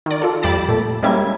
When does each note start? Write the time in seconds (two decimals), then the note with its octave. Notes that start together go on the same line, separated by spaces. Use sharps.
0.06 D#3 D5
0.22 F4 A4
0.42 F2 G3 B5 D6 A6 E7
0.68 A#2 A3
1.03 G3 G#3 A#3 C#4 E4 G#6